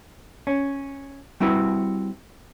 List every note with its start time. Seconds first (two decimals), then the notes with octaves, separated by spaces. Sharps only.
0.47 C#4
1.40 G3 C4 E4 F#4 B4